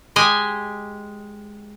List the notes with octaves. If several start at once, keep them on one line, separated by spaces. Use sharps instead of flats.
G#3 G4 D#5 G#5